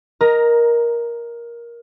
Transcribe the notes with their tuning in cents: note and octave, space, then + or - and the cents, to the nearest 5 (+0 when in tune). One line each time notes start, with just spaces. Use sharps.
A#4 +15 D#5 +0 A#5 +0